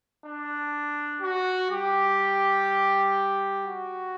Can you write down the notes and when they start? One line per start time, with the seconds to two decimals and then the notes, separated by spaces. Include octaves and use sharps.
0.25 D4
1.22 F#4
1.71 G3 G4
3.65 F#4